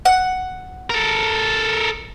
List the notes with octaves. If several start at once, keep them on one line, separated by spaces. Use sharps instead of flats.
F#5
A4 A#4